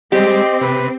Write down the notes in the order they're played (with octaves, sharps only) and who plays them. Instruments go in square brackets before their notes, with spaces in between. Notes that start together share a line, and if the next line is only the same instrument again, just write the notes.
[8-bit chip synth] G3 G#3 [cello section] C4 [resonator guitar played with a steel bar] G4 [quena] D#5
[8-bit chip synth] C3 [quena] B4